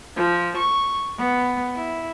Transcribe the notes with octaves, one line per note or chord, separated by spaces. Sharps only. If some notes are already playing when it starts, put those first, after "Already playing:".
F3
C#6
B3
E4